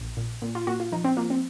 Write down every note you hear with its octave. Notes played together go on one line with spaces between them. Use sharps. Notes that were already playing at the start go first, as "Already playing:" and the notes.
Already playing: A#1
A#2
A#2
F4
A#2 F#4
F4
F3 D#4
C4
F3 A#3
C4